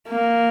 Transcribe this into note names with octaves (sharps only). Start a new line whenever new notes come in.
A#3